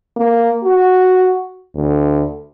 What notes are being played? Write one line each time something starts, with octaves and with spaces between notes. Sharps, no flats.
A#3
F#4
D2